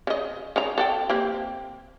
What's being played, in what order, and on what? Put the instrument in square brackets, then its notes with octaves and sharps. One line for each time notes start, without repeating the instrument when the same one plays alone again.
[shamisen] C#3 D#5
C#3 D#4 A#5
A4 F#5 G5
A#3 C4 G4